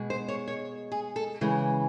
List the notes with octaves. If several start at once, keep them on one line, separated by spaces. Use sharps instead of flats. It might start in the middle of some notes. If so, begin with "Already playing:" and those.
Already playing: B2 G#3
C5
C#5
C#5
G#4
A4
C#3 E3 G#3